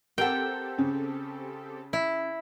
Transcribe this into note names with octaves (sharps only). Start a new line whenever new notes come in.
C4 G4 A4 A#4 F#5 G5
C#3 C#4
E4